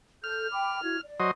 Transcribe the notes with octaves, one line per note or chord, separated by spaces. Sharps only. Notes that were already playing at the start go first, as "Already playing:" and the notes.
A4 F6 G6
G5 B5 D6
E4 F#4 G#6
D5
F#3 C5 D#5